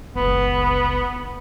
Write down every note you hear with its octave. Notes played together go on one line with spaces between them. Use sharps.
F#1 C#2 B3